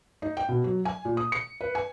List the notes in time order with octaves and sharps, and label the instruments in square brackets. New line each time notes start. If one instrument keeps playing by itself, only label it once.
[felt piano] D#4
G5
B2
F#3
G#5
A#2
D#6
C#7
B4
G#5